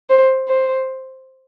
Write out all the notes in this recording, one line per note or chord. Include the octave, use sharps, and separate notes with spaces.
C5
C5